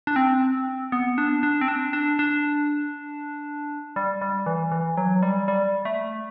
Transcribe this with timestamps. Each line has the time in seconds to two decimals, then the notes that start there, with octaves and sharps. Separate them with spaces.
0.07 D4
0.16 C4
0.92 B3
1.18 D4
1.43 D4
1.61 C4
1.68 D4
1.93 D4
2.19 D4
3.96 G3
4.21 G3
4.46 E3
4.72 E3
4.97 F#3
5.23 G3
5.48 G3
5.85 A3